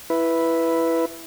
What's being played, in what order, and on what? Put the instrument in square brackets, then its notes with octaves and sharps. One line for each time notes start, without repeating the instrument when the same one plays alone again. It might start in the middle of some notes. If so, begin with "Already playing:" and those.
[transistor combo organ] E4 B4